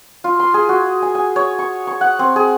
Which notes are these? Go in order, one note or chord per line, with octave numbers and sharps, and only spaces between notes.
F4
C6
G#4
F#4
G#5
G#5
C#5
C#6
C#6
F#5
C4
G#4